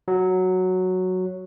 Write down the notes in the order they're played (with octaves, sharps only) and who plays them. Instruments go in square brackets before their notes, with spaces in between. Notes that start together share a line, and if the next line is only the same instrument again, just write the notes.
[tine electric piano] F#3